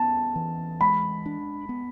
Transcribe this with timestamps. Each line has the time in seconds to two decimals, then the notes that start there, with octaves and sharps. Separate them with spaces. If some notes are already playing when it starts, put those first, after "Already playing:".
Already playing: B3 A5
0.36 E3
0.81 G#3 B5
1.26 D4
1.69 B3